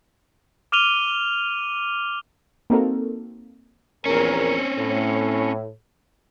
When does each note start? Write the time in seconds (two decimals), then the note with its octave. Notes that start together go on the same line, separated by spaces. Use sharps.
0.72 D6 F6 D#7 F7 G7
2.70 A#3 C4 D#4 F#4 A4 A#4
4.06 A#1 E2 C4 C#4 A#4
4.77 A2